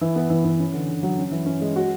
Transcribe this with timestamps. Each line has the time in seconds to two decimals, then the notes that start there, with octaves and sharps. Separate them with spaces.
0.01 E3
0.16 B3
0.30 E3
0.44 E3
0.59 C#4
0.74 D3
0.89 D3
1.03 F#3
1.18 C#4
1.31 E3
1.46 C#4
1.61 G#3
1.76 F#4